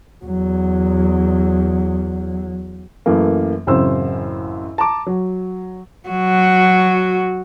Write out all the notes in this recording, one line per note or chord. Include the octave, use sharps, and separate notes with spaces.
E2 F#3
F#2 E3 A3 A#3
A1 F#2 C#3 C4 C5 E6
A5 A#5 D6
F#3
F#3 F#4